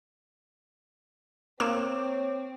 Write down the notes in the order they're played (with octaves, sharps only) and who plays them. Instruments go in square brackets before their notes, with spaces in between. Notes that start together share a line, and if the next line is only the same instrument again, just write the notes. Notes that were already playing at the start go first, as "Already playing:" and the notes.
[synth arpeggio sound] A#3 E7 [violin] C4 [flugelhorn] C#5 [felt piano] D6